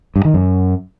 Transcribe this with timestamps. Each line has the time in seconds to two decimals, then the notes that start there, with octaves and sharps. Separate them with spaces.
0.16 G2
0.25 D#3
0.34 F#2